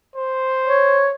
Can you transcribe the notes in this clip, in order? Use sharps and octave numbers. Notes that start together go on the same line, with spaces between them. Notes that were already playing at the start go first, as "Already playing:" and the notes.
C5
C#5